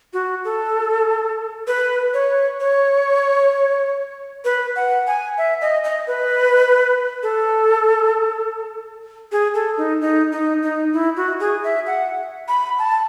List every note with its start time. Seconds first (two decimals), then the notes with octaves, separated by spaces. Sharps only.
0.13 F#4
0.44 A4
1.67 B4
2.14 C#5
2.60 C#5
4.45 B4
4.76 F#5
5.07 G#5
5.38 E5
5.61 D#5
5.84 D#5
6.07 B4
7.23 A4
9.32 G#4
9.54 A4
9.78 D#4
10.01 D#4
10.32 D#4
10.62 D#4
10.93 E4
11.17 F#4
11.40 G#4
11.64 E5
11.87 F#5
12.48 B5
12.79 A5